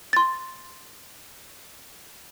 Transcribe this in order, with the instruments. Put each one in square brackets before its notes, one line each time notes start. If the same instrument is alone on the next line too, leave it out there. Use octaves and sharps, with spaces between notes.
[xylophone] C6 A6